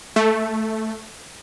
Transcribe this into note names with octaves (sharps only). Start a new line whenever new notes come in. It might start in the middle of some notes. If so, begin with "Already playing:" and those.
A3